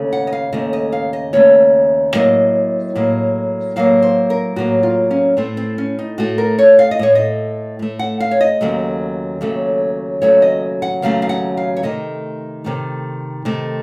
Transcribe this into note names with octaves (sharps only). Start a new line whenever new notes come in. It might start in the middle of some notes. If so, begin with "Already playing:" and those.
Already playing: D#2 C#3 A3
F#5
D#5
F5
D#2 C#3 A3 D#5
D#5
F5
D#5
D#2 C#3 A3 C#5
A2 F#3 A#3 D#5
A2 F#3 A#3
A2 F#3 A#3 F5
C5
A#4
A2 F#3 A#3 F#4
F4
C#4
A2 A3 C4
C4
C#4
D#4
A2 A3 F#4
A#4
C#5
F5
D#5
A2 A3 C#5
D#5
A2 A3
F#5
F5
C#5
D#5
D#2 C#3 F#3 A3
D#2 C#3 F#3 A3
D#2 C#3 F#3 A3 C#5
D#5
F#5
D#2 C#3 F#3 A3 F5
F5
F#5
F5
C#5
C3 D#3 A3 D#5
C3 D#3 A3
C3 D#3 A3